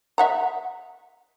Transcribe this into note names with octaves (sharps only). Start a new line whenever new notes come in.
E5 F#5 A#5